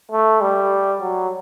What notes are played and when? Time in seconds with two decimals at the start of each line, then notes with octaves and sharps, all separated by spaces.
0.11 A3
0.41 G3
1.01 F#3